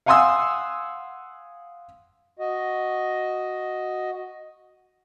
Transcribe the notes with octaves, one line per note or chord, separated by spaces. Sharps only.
F5 F#5 G#5 C6 D#6 E6
F#4 D#5